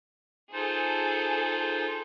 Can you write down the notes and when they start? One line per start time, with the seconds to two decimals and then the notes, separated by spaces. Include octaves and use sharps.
0.53 D#4 F4 G#4 A4 C5